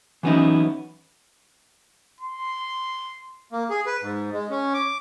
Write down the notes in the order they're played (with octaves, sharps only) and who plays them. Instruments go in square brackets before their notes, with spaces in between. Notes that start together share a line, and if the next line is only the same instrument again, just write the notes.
[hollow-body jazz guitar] E3 F#3 B3 C#4 D#4 E4
[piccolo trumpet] C6
[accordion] A#3
G#4
B4
G#2
G#3
C#4
D6